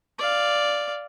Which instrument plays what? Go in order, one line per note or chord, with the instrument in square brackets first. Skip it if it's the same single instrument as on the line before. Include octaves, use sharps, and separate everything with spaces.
[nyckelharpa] D5 F5